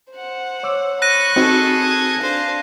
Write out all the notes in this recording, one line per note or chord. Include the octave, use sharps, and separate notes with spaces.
C5 F#5
C#5 D6 E6
B5 C#6 F#6 A#6 D#7
C4 D#4 F#4 G#4 A4
D#6 G#6
D4 C5 F5